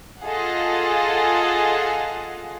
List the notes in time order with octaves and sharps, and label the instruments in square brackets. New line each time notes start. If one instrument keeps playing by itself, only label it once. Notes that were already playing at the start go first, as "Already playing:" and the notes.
[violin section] F4 G#4 A4 D#5 F5 F#5